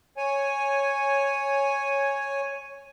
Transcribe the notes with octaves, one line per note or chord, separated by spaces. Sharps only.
C#5 G#5